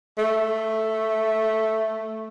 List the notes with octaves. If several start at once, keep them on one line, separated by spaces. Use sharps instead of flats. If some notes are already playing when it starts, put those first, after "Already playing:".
A3